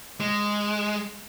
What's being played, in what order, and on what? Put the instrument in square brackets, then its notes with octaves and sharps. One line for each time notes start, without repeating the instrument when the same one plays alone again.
[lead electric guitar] G#3